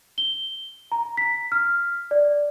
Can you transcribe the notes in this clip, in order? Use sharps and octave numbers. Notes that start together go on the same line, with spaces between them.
G7
A#5
B6
F6
D5